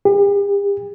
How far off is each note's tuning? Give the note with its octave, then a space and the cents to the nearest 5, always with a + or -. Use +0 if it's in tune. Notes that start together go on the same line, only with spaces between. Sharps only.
G4 +45